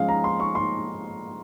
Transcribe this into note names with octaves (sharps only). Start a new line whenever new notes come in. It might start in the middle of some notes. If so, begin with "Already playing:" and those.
Already playing: F3 G#3 C#4 F5
A#5
C6
C#6
C6